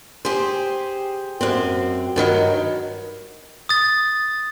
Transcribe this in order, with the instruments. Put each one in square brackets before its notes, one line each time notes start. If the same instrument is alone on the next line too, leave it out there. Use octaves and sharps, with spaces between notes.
[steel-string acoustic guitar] G4 G#4 C5
F#2 C4
G2 D#3 E3 F#3
[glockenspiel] D#6 A6